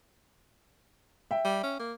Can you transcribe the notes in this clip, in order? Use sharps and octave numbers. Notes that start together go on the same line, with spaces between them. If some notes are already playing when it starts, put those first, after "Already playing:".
E5 G5
G3
C#4
A#3